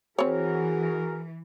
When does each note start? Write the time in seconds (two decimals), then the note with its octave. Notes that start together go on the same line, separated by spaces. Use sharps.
0.18 E3 C4 F#4 G#4 A#4 C#5